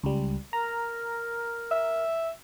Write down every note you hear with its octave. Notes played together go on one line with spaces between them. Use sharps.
C#2 G3
A#4 A#5
E5